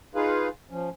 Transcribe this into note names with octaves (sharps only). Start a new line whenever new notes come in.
D#4 F4 G#4 B4 F5
F3 C#4